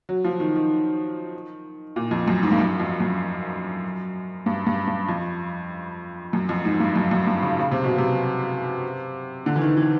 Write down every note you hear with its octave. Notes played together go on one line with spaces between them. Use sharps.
F#3
F3
D#3
D#3
A#2
F2
F#2
G#2
G2
F#2
F2
F#2
G2
G2
G2
F2
F#2
F2
G#2
G2
F#2
F#2
G2
C#3
C#3
C3
B2
C3
D3
E3
D#3
E3